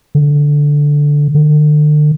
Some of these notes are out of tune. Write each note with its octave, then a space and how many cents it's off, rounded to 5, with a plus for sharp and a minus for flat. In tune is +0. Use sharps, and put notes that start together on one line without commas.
D3 -5
D3 +40